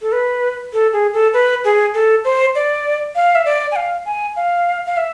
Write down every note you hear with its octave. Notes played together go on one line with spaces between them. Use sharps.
A4
B4
A4
G#4
A4
B4
G#4
A4
C5
D5
F5
E5
D5
G#5
F5
G#5
F5
F5
E5